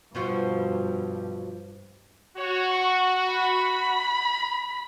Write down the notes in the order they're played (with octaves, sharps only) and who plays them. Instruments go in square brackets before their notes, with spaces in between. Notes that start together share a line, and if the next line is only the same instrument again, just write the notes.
[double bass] G2 [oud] B2 F3 F#4
[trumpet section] F#4 [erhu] C#5
[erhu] C#6
B5